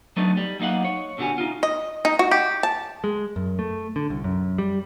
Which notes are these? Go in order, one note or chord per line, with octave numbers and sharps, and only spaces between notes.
F#3 A3 B3 D4 D#4
G3
F#3 A#3 D#4 F5 F#5
C#5
B2 D3 F#4 G4 G#5
D#4 F4
D#5
D#4
F#4
G4
A5
G#3
F#2
A3
D3
C2
F#2
G3